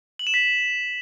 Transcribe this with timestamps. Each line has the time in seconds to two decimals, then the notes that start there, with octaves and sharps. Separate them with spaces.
0.19 F#7
0.27 E7
0.34 B6